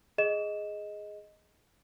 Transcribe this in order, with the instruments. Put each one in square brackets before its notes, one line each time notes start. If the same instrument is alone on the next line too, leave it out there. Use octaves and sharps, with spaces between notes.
[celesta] G#4 D#5 E7